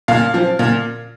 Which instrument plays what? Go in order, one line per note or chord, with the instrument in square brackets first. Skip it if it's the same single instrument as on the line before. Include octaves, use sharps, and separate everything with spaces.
[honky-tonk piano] A#2 F5
F3
A#2